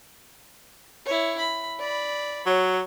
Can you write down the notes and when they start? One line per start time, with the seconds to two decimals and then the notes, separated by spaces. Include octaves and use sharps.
1.05 E4 C#5
1.38 B5
1.79 D5 B5
2.46 F#3 C#5